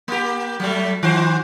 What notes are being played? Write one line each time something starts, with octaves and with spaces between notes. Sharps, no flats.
A#3 G4
F#3 G3 A3
D#3 F#4 C5